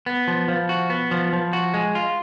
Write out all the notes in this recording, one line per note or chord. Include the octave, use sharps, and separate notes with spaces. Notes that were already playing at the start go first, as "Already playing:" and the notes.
B3
F3
F3
F#4
B3
F3
F3
F#4
G#3
F4